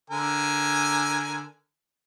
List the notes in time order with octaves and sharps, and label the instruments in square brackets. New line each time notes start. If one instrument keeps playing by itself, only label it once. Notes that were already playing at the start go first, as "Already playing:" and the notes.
[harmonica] D3 A#4 G#5